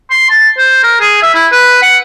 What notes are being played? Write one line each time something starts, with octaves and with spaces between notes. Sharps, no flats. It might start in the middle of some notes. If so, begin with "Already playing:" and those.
C6
A5
C5
A#4
G#4
E5
E4
B4
F#5